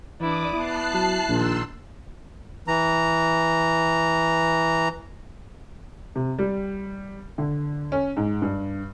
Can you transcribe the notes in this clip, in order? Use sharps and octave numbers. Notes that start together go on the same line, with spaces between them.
E3 D4 E4 D5 D6 D#6
B3 E4 A5 F#6 C7
F#3
A#1 A#2 D#3 C6 E6
E3 A#5
C3
G3
D3
C#4
G#2
G2